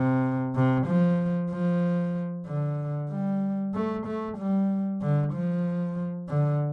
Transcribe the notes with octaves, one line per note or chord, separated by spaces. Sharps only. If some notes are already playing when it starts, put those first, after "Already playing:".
Already playing: C3
C3
F3
F3
D3
G3
A3
A3
G3
D3
F3
D3